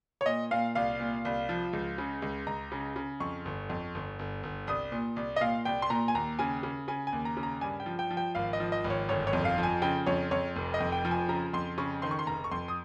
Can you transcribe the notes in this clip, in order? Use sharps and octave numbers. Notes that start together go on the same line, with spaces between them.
C#5
A#2 D#5
A#2 F5
C2 F5
A#2
C2
F3
C#2
C#3
C#2
C#2 A#5
C#3
C#3
F2 C#6
G1
F2
G1
G1
G1
C2 D#6
A#2
C2
D#5
A#2 F5
C2 G5
C6
A#2 A#5
G#5
D#2 A#5
C#3 G#5
C#3
C#3 G#5
G#5
D#2
A#5
C#3
A#5
G2 G#5
G5
F3
G5
F3
G5
G#1 F5
D#5
F3
D#5
G#1
C#5
G1 C#5
C#5
F2
F5
F3
G#5
C#3 G5
F2 C#5
F2 C#5
F1
D#5
F2
G5
F3
G#5
C#3 A#5
F2 C6
C#3 C#6
D#3 C6
C#6
C6
F1 A#5
C#6
F2 C6
D#6